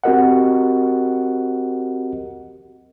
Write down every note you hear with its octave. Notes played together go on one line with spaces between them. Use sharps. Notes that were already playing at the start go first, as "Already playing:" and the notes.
C4 F#4 G4 A#4 D#5 F#5